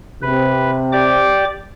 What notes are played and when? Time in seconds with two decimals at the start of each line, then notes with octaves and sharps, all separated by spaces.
0.22 C3 B4
0.93 G4 D5 D6